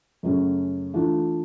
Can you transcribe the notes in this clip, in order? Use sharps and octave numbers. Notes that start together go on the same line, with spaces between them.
F#2 C#3 F#3 A3 C#4
E3 A3 D4 F4